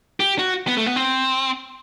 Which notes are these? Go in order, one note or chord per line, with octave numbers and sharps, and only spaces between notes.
G4
F#4
B3
A3
B3
C4